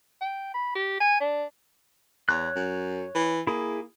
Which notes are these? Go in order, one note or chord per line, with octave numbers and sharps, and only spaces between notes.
G5
B5
G4
G#5
D4
E2 C#5 F#6
F#2
E3
A#3 E4 G#4